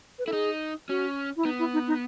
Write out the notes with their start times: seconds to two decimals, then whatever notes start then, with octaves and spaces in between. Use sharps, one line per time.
0.19 B4
0.26 E4 A4
0.33 D#4 G#4
0.89 C#4 F#4
1.37 E4
1.45 B3 D#4
1.59 E4
1.73 D#4
1.88 D#4